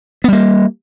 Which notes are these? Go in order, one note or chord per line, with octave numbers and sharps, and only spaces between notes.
G3 A#3 B3